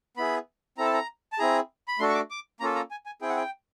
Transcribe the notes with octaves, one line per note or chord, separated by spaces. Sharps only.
B3 E4 G#4 B5
C4 E4 A4 A#5
A5
A#5
A5
C4 E4 G#4 A#5
B5
A3 D4 F#4 A4 C6
C#6
D6
D6
A#3 C#4 F4 A4 A#5
A#5
G#5
G#5
C4 E4 G#4 G5
F#5
G5